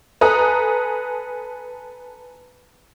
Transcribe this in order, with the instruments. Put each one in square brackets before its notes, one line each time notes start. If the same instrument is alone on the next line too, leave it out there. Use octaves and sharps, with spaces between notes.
[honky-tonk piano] A4 B4 G#5 A#5 D#6 F#6